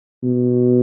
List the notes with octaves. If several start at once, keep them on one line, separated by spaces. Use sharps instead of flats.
B2